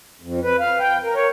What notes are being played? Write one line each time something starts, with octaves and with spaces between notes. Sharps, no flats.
F2
B4
F5
G5
A#4
C#5